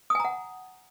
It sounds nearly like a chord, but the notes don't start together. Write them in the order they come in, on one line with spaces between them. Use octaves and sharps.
D#6 G#5 A#5 F#5